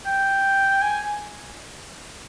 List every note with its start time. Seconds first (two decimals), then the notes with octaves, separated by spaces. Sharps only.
0.06 G5
0.82 G#5